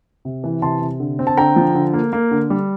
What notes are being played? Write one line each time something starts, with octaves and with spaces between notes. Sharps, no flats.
C3
E3
C3 A5 C6
C3
D3
C4
A5
D3 G5 A#5
F3
D3
A#3
A#3
D3
G3